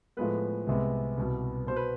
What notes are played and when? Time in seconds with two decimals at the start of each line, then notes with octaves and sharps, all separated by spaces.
0.17 A2 F3 G#3 B3 B4
0.67 C2 C3 G#3 B3
1.17 C2 B2 B3
1.67 B2 B3 C5
1.76 B4